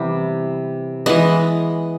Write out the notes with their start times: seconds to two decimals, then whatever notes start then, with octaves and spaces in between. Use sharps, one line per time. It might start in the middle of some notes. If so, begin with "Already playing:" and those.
Already playing: C3 E3 G3 B3
1.06 E3 G#3 B3 D#5